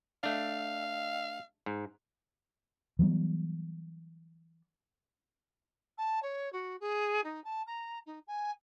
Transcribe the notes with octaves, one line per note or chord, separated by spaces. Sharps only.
A3 D4 F5
G#2
E3 F#3 G3 B3
A5
C#5
F#4
G#4
D#4
A5
A#5
D#4
G#5